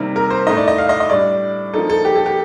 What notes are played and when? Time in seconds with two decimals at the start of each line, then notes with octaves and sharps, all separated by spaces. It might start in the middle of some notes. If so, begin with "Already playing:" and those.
Already playing: C3 D#3 G3 A#3
0.16 A#4
0.30 C5
0.47 A2 A3 D#4 D#5
0.57 D5
0.68 D#5
0.78 F5
0.89 D#5
1.00 D#5
1.10 A2 G3 D4 D5
1.74 F3 A#3 D#4 A4
1.90 A4
2.05 G4
2.16 A4
2.26 G4